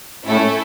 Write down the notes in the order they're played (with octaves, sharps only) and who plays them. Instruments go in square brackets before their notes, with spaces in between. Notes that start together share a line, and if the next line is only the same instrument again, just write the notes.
[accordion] A2 [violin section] A3 C#4 E4 A4